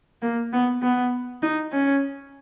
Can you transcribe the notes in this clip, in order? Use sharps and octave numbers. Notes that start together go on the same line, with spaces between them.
A#3
B3
B3
D#4
C#4